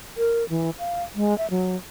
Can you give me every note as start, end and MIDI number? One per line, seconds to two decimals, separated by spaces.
0.17 0.47 70
0.49 0.70 52
0.79 1.03 77
1.16 1.36 56
1.38 1.46 76
1.50 1.76 54